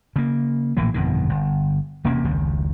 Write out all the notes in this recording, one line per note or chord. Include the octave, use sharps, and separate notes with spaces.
C#3 A#3
A#1 A2 E3 A#3
G1 F2 B2 D#3
G1
E1 C3 A#3 C#4
F1 C#2 D#3